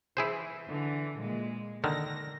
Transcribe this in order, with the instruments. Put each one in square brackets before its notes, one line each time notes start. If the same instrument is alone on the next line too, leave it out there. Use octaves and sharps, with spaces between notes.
[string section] E3 [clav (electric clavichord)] E4 G#4 C5
[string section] D3 E3
A#2 G#3
[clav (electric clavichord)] D3 D#3 [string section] A#6